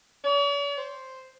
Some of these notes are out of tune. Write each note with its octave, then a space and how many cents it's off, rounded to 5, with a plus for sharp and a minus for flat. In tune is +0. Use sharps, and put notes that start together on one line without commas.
C#5 +45
C5 +0